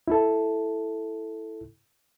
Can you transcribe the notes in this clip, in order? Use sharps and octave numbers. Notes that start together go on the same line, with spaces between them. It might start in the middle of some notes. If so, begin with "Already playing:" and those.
E4 A4